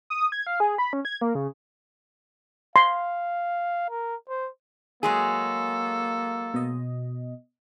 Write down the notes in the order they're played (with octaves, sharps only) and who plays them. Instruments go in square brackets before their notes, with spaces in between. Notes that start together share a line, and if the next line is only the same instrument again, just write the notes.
[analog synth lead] D#6
G#6
F5
G#4
B5
C#4
G#6
A#3
C#3
[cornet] F5 [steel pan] C6
[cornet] A#4
C5
[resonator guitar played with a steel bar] F#3 G#3 G#4 [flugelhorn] A#3 [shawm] A4
[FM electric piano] B2 D#5